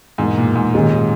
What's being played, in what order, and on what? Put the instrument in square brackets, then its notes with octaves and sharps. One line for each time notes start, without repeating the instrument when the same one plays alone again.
[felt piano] E2 B2 A#3 [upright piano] G#2
[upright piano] A#2
G#2
[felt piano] D#2 D#3 G#3 C#4 G#4 [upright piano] A#2